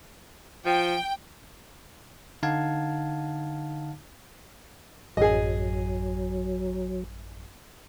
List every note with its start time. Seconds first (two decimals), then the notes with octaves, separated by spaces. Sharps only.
0.66 F3 G5
2.43 D3 D#4 F5 F#5 A5 G#6
5.17 A1 F#2 F#3 G#4 D#5